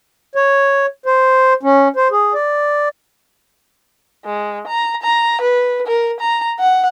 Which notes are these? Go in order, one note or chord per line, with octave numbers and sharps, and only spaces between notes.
C#5
C5
C#4
C5
G#4
D5
G#3
A#5
A#5
B4
A#4
A#5
F#5